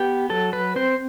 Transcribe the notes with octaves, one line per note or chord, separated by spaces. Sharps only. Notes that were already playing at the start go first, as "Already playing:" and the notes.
Already playing: B3 G4
F#3 A4
B4
C4 C5